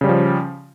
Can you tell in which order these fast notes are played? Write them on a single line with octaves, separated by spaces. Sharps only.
C#3 G3 C#4 F3